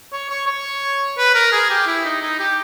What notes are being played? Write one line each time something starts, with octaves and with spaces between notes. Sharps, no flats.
C#5
C#5
C#5
B4
A#4
G#4
G4
E4
D#4
D#4
G4